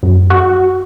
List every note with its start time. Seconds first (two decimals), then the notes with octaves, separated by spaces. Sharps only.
0.03 F#2
0.30 F#4